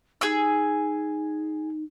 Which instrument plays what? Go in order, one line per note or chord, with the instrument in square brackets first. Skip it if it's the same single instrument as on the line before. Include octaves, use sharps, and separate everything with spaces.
[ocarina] D#4 [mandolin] G#4 G#5 E6